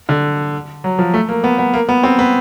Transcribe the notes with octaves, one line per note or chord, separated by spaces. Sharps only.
D3
F#3
F3
A3
A#3
B3
B3
A#3
B3
C4
B3